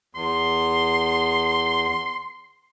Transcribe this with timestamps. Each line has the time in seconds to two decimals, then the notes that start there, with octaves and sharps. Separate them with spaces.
0.15 E2 C6